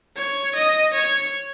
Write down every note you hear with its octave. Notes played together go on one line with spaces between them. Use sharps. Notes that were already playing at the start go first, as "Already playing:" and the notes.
C#5
D#5
C#5